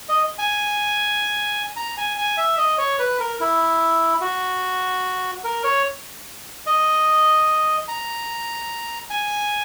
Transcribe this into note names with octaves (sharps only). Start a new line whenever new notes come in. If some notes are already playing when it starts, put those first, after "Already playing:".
D#5
G#5
A#5
G#5
G#5
E5
D#5
C#5
B4
A#4
E4
F#4
A#4
C#5
D#5
A#5
G#5